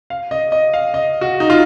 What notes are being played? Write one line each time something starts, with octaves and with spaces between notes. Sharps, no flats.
F5
D#5
D#5
F5
D#5
F#4
D#4
F4